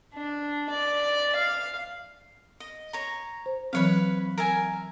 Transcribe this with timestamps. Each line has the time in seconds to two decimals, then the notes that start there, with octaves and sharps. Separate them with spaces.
0.14 D4
0.70 D5
1.36 F5
2.60 D#5
2.93 C#5 A#5
3.46 C5
3.73 E3 F#3 C4 B4 C#5 F5
4.38 A#4 E5 G#5